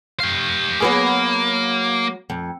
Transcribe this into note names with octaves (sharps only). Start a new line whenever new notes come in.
G4 F5
F#3 A#3 B3 G#4
F2